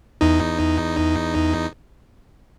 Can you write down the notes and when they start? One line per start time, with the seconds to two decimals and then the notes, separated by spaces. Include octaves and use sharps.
0.21 E2 D#4